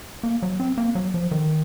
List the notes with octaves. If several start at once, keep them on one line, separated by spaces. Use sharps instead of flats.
A#3
F#3
C4
A#3
F#3
F3
D#3